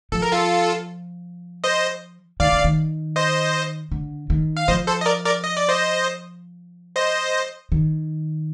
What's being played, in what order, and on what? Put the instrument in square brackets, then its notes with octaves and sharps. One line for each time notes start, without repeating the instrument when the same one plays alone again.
[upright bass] F3 [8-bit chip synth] A4
[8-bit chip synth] A#4
F4 A4
C5 D#5
[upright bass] D#3 [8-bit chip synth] D5 F5
[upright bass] D3
D#3
[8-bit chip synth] C5 D#5
[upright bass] D3
D#3
[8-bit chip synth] F5
[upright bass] F3 [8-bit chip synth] C5 D#5
[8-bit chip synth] A4 C5
D#5
A#4 D5
A#4 D5
D#5
D5
C5 D#5
C5 D#5
[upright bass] D#3